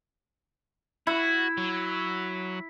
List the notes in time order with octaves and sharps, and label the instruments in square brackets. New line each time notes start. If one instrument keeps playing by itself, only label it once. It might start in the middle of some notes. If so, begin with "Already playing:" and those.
[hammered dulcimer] E4 [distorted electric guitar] F#4
[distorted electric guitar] F#3